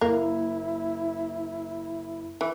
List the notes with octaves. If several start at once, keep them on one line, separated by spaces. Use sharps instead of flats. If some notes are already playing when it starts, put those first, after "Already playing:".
F#1 A#3 E4
E3 E5